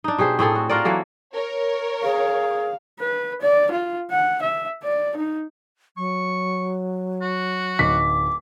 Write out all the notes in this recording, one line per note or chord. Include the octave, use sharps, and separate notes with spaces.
D4 D#4
B2 G4 G#4 C5
A2 C4 G#4 A4
F#4
F4 F#4 A#4 D5
E3 F#3 A#3 A4
A#4 C#5
G#4 F5
B4
D5
F4
F#5
E5
D5
D#4
F#3 C#6
F#4
D1 D#4 D6 B6